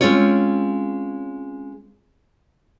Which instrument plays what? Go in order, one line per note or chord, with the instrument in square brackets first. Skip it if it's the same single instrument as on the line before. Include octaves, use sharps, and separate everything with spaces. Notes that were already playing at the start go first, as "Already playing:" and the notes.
[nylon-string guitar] G#3 C4 C#4 F4 C#5